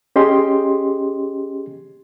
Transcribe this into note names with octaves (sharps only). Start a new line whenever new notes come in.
C#4 G4 G#4 D#5 C6